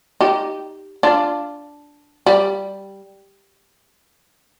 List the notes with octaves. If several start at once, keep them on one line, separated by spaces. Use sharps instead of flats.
D#4 G4
D4 F4
G3